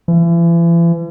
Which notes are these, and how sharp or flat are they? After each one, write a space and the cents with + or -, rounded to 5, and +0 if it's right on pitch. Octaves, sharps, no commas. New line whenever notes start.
E3 +40